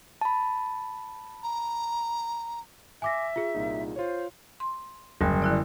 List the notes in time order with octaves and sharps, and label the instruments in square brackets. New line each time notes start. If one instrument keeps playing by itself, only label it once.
[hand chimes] A5 B5
[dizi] A#5
[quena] E5 [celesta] G#5 D6 A#6
[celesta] F4 G#4
[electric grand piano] C2 A#2 D#4
[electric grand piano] F4 C#5 [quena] C5
[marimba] C6
[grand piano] F#1 [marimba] D3 G3
[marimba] D3 E4 D5